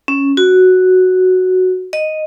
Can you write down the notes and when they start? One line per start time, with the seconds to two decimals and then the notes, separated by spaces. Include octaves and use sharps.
0.08 C#4
0.37 F#4
1.93 D#5